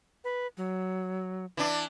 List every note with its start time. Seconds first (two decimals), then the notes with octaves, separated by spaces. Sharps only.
0.24 B4
0.57 F#3
1.57 E3 D4